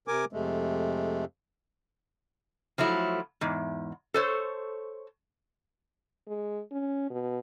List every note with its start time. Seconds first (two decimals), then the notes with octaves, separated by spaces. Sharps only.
0.08 C3 A#4 G#5 D6
0.33 F2 C3 G#3 A3
2.78 F3 F#3 A3 E4
3.41 E2 G#2
4.14 A4 C5 C#5
6.27 G#3
6.71 C#4
7.10 B2